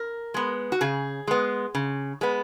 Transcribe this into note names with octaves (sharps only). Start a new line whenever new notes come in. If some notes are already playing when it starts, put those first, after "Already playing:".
Already playing: A#4
G#3 B3
F#4
C#3 G#4
G#3 B3
C#3
G#3 B3